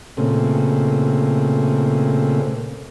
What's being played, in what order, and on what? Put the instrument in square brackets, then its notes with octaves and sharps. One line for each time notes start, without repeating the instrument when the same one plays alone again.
[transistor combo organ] A#2 C#3 A3 C4